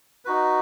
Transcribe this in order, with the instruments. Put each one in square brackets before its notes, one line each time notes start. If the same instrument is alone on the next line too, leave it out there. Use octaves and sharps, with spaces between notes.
[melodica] D#4 F#4 B4